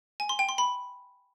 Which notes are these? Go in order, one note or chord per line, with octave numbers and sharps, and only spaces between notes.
G#5
C6
G5
C6
B5